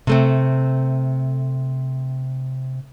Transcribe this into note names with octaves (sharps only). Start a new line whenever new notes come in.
C3 A3 C4